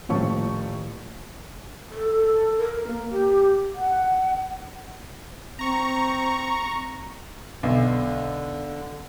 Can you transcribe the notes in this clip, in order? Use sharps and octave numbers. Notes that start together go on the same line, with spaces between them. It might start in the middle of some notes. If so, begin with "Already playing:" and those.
D#1 A2 F3 C#5 C#6
A4
A#4
A#3
G4
F#5
C4 A#5 C#6
B1 D3